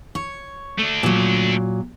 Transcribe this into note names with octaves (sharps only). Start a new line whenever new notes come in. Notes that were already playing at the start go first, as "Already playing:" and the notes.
C#5
A3 D4
A#2 F#3